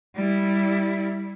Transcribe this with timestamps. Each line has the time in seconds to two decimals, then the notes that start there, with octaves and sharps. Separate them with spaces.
0.15 G3 E4